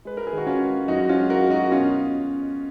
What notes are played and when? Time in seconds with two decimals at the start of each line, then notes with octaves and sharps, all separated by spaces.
0.05 G#3 B4
0.17 A#4
0.27 G#4
0.33 D#3 F#4
0.47 C#4 F4
0.61 G#3
0.88 F#2 D#4 F#4
1.09 C#4 F4
1.16 G#3
1.30 F#4 A#4
1.44 G#3
1.50 D#4 F#4
1.71 B2 C#4 F4